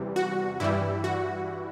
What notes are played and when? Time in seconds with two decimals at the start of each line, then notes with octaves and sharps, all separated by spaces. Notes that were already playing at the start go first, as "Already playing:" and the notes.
Already playing: E2 C3 E3 G3
0.16 F#4
0.60 G2 E3 G3 E4
1.04 F#4